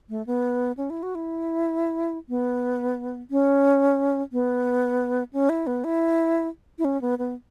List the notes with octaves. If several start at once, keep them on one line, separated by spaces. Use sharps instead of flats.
A3
B3
C#4
E4
F#4
E4
B3
C#4
B3
C#4
E4
B3
E4
E4
C#4
B3
B3